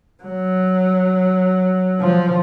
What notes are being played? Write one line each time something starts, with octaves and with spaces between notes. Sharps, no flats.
F#3
F3